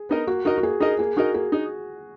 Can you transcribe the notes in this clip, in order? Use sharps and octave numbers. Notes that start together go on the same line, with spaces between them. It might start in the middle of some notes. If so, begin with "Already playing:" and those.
Already playing: G#4
B3 D#4 A#4 D#5
A#3 F#4
D#4 F#4 A#4 D#5
F#4
A#3 G#4
D#4 G#4 A#4 D#5
A#3 G#4
D#4 F#4 A#4 D#5
A#3 G#4
D#4